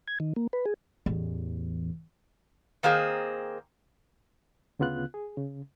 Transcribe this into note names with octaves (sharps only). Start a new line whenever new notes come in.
G#6
D#3
A#3
B4
G#4
A1 E2
D#3 A#3 C4 G#4
D2 C#3 B3 F4 F#6
G#4
C#3